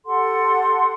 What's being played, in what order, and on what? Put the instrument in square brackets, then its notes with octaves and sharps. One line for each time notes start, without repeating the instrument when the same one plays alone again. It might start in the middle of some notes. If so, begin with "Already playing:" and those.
[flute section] G4 A4 F#5 C6